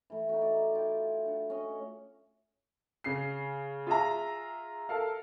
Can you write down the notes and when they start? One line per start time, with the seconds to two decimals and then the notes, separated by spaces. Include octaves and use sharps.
0.10 E3 A3
0.29 D#4 F#4
0.42 D5
0.75 E4 F4 G5
1.25 D4 F#5
1.50 C#4 D#5
3.04 C#3 C7
3.87 F4 G#4 E5 A#5
4.89 A4 A#4 F5